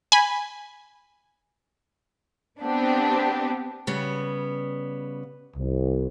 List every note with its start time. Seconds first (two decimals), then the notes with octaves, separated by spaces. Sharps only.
0.12 G#5 B5
2.62 B3 C4 D4 G4
3.87 C#3 G3 B3
5.57 C2